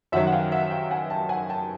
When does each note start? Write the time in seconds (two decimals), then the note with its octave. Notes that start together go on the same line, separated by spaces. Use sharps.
0.12 F#2 D#3 F#3 E5 F#5
0.27 F#5
0.32 F5 G5
0.51 E5 F#5
0.71 F5 G5
0.90 F#5 G#5
1.10 G5 A5
1.29 F#5 G#5
1.49 G5 A5